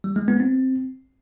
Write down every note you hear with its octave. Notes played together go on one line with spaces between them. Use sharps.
G3
G#3
B3
C4